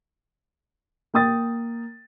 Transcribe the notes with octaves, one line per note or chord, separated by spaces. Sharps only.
A#3 G5 D#6 A6